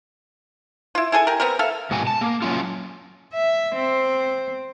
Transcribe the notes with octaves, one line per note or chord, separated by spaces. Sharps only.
E4 F4
E4 G#4 A4 G#5
G4 A#4
B3 C4 A#4
A4 E5 F5
G#2 B2 B3 F#4 G#5
A5
A#3
F#3 C#4 E4 F4
E5
C4